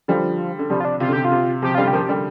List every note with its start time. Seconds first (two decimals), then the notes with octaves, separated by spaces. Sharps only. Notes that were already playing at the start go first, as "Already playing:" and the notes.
0.08 D3 F3 G3
0.59 D3
0.69 C3 F3 G3
0.80 F4
0.85 D4
1.00 C3 F4
1.08 D3
1.13 C3 G4
1.25 F4
1.32 C3
1.62 C3 F3 G4
1.75 D3 G3 F4
1.88 G4
1.93 F3 A#3
2.08 D3 G3